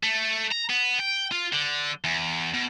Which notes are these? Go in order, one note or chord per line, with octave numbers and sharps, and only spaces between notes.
A3
A#5
B3
G5
F4
D3
E2
B2